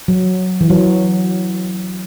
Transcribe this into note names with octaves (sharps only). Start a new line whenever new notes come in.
F#3
E3
F#3